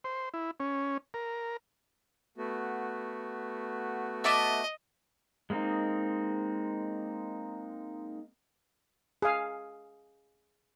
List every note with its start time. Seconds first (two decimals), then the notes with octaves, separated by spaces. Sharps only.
0.04 C5
0.34 E4
0.60 C#4
1.14 A#4
2.38 A3 B3 F#4
4.24 D#5 E5 A5 D6
5.50 G#3 A#3 C4 D#4
9.22 G#4 F5